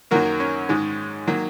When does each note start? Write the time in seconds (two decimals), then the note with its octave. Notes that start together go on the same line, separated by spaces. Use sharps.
0.11 F#2 D#3 F#3 A#3 F#4 A#4
0.40 C#4
0.69 G#2 D#3 G#3
1.27 D#3 F#3 A#3